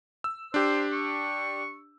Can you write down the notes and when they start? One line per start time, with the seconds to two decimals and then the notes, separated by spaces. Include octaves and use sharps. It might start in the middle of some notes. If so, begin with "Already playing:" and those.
0.24 E6
0.54 D4 G4 C5
0.93 C#6